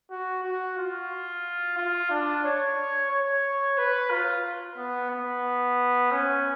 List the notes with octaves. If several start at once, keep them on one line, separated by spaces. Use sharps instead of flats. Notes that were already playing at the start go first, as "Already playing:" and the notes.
F#4
F#4
F4
F4
D4
C#5
C#5
B4
F4
B3
B3
C#4